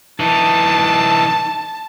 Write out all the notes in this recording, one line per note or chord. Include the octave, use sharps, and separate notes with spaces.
E3 D#4 A5